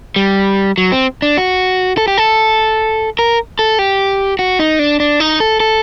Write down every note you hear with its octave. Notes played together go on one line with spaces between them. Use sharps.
G3
F#3
C4
D4
F#4
A4
G4
A4
A#4
A4
G4
F#4
D#4
D4
D4
D#4
A4
A4